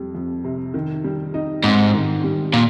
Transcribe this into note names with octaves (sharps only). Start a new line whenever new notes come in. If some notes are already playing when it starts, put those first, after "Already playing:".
Already playing: F2 G3
F2
C3
D#3
G3
D#4
G#2 C4
D#3
G3
A#2